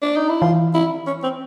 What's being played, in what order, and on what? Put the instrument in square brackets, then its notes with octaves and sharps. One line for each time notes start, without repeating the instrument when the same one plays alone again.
[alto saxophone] D4
D#4
E4
[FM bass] E3 [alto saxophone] F4
[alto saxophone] E4
C#4
C4